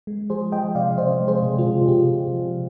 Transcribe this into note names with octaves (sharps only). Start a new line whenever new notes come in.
G#3
F3 G#4 C5
F3 D#5 G5
C3 D5 F5
C3 C5 D#5
G#3
G#4 C5
C3
F4 G#4
C3
C3 G4
C3
F3